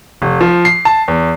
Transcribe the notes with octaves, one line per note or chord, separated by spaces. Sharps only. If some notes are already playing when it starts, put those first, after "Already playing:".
F1
F3
C7
A5
E2